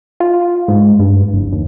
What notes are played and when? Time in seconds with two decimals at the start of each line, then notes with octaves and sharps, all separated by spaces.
0.20 F4
0.68 G#2
0.99 G2
1.33 F#1
1.53 D#2